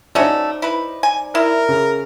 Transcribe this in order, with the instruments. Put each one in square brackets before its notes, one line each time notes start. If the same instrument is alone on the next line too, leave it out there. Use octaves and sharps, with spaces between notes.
[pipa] A3 C#4 F#4 [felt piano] D#4 C5 D5
[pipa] E4 B4
G#5
[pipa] E4 [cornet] A#4
[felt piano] C#3